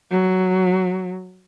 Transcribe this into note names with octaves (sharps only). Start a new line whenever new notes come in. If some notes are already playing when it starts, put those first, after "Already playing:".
F#3